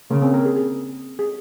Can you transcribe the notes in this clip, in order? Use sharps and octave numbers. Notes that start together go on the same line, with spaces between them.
C#3 A#3
C4
A#4
G#4
G#4
G#4